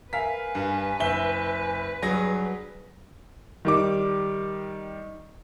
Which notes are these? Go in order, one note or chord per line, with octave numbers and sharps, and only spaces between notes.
A#4 B4 E5 F5 G#5 B6
G2
F#1 E5 G7
G2 F#3 G#4 A#6
D#3 G3 D6